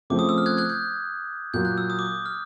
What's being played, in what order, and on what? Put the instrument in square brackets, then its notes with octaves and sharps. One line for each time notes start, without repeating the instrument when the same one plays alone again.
[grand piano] C#3 F3 A3 C4 [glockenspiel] D6
[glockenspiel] D#6
E6
F6
F#6 G#6
F#6 G#6
G6
[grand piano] A#2 F#3 A#3 [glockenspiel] G6
[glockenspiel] F#6
E6
D#6
D6
F6